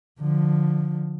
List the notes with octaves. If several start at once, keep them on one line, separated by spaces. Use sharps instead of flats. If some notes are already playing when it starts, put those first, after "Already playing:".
D3 F3